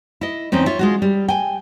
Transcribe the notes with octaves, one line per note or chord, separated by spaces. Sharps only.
E4 D#5
E2 C4 C#4 D#4
F4 C#5 E5
G#3 F4 F#4
G3
G5 G#5